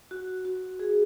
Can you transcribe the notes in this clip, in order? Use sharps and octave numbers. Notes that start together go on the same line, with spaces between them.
F#4
F#4
G#4